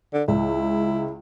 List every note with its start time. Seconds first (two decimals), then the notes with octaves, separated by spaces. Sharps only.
0.13 D3
0.28 C#2 E4